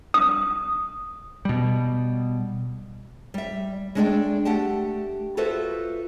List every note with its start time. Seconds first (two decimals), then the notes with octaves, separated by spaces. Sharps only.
0.14 D#6
1.45 B2 G3
3.34 G3 E5
3.95 G#3 A3 D4 G#4 D5 G5
4.45 A3 G4 F#5 G5 A5
5.37 F4 F#4 A4 B4 C5 E5